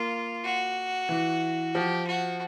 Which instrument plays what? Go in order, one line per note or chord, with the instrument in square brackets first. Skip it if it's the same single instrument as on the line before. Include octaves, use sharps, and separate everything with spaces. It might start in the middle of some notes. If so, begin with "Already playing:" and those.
Already playing: [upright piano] A#3 [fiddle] F4
[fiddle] F#4
[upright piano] E3
[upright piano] F3 [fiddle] G4
[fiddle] F#4